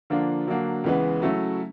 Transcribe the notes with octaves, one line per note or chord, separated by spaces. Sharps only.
D3 F3 A#3 D4 F4
D3 F#3 A#3 D4
C#2 C#3 E3 G#3 B3
C#3 F#3 A3 C#4 E4